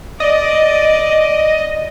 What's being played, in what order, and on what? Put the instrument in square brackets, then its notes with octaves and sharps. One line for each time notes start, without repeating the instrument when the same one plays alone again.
[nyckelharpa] D5 [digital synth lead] D#5